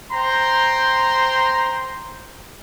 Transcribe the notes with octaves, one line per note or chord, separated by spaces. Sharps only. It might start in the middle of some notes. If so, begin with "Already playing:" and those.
C5 G5 A#5 C6